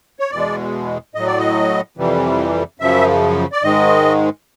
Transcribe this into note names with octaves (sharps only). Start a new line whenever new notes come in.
C#5
E2 B2 G#3 D5
A2 F#3 D#5
D5
D#5
F2 C3 E3 G3
F#2 C#3 F3 E5
D5
G#2 D#3 G#3 D#5